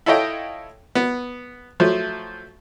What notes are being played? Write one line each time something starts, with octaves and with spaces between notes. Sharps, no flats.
E4 F4 A4 C#5 D#5 G5
B3
F3 F#3 A3